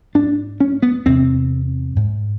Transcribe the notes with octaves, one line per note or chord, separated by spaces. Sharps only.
G#2 D4
C#4
B3
E2 C3 C4
G#2